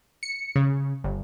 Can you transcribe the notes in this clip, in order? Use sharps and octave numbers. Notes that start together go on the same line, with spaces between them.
C#7
C#3
G1